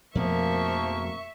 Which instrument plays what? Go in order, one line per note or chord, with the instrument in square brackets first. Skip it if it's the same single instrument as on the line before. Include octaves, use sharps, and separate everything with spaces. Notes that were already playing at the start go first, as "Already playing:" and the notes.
[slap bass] F2 B2 A3 [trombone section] G#2 A#3 [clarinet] F3 [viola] E5 C#6